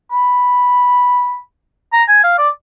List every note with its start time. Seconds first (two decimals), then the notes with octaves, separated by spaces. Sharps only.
0.12 B5
1.93 A#5
2.08 G#5
2.24 F5
2.38 D5